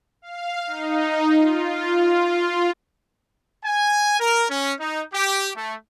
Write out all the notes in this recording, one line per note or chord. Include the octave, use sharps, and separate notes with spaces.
F5
D#4
F4
F4
G#5
A#4
C#4
D#4
G4
A3